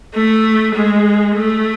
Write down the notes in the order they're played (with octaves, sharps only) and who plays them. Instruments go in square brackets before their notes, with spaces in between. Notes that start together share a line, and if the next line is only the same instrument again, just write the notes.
[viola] A3
G#3
A3